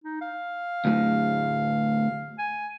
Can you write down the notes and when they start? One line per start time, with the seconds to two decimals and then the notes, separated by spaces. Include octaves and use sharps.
0.04 D#4
0.21 F5
0.85 D2 A2
2.38 G#5